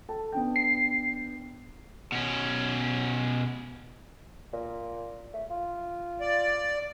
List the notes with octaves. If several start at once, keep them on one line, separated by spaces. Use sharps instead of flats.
A4 A5
B3 D4 G5
C7
B2 C#4
A#2
A3
F4
D5